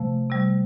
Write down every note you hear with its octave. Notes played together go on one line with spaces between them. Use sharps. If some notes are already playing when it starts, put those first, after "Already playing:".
Already playing: C3 F3 A3
C3 G3